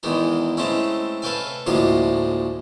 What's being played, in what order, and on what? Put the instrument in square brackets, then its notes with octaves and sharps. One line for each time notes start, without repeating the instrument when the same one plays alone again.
[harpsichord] E2 D#3 E3 G#3 D#4
G#3 A3 C4 C#4 E4
A4 B4 C#5 F5 G5 G#5
D2 A2 F3 G#3 A#3 G#4